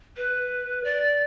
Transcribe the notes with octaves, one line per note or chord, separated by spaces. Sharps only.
B4
D5